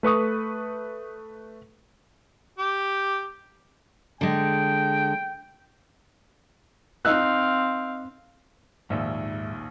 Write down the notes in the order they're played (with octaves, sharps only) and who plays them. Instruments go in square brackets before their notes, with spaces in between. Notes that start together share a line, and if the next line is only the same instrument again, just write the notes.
[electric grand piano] A3 B4 C#6 D#6
[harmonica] G4
[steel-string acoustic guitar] D3 G#3 [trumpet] G5
[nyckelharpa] C4 F5 [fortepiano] D#4 E6 F#6
[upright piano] A#1 D#2 [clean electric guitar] G#2 E5